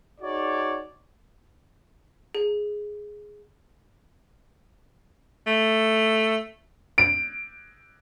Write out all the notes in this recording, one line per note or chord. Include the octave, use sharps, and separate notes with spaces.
D#4 F#4 G#4 C#5 D5
G#4
A3
D7